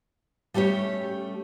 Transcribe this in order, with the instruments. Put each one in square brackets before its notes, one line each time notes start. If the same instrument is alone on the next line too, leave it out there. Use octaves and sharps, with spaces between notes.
[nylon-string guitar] G3 A3 C#4 G4 C#5